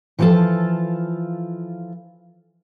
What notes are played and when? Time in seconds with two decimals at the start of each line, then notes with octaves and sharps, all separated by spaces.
0.19 E3 F3 G3 F4 A4 A5